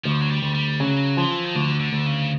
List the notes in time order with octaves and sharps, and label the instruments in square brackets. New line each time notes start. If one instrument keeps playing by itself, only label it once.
[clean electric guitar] D2 [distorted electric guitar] F3
[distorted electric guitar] F#3
G3
[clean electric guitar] D2
[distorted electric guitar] G3
[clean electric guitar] C#3 [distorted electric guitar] F#3
[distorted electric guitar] E3 [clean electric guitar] F3
[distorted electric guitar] D#3
[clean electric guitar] D2 [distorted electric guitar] D3
[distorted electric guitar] D3
[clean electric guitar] D2
[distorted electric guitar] C#3